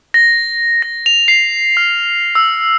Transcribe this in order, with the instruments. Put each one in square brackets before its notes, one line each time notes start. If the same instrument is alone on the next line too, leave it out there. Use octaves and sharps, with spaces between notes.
[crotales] A#6
A#6
F7
C7
F6
E6